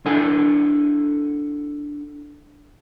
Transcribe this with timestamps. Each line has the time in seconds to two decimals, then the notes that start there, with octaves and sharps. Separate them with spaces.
0.05 D4 E4 A4 F#5 G#5